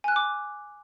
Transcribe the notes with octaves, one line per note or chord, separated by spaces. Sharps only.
G#5 D6 F6 F#6